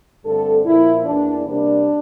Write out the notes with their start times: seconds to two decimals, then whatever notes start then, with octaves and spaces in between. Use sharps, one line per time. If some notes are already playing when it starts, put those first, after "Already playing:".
0.24 G2 D3 A3 C4 A4
0.65 A#2 F3 A#3 E4
1.05 E2 E3 A#3 D4
1.44 C3 G3 A#3 D4